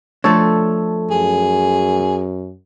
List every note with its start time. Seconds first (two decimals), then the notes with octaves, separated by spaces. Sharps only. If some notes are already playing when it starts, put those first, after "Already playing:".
0.24 F3 A3 D4 A4 C#5
1.11 F#2 G#4